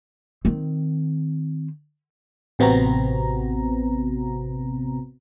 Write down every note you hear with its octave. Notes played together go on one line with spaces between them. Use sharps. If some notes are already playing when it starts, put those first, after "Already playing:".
D#3 C4
A1 C3 B3 C4 F#4 A#5